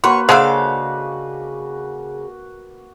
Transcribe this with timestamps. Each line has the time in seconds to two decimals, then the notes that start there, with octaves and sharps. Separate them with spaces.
0.04 A#3 F#4 B4 C#5 C6
0.29 C#3 G#3 D4 A4 C5 F5 F#5 C6